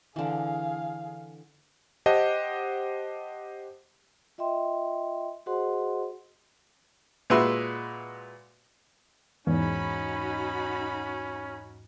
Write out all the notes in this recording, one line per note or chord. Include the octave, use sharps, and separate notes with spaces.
D3 E3 G#4 F5
G4 C5 D#5 F#5 A5
F4 D#5 E5 G5 C6
F#4 G#4 C5 D#5 F#5 C6
A#2 G#3 F#4 B4 E5 C6
E2 G#2 C#4 D#4 F#4 B5